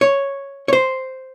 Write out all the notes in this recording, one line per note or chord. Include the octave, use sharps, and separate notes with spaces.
C#5
C#5
C5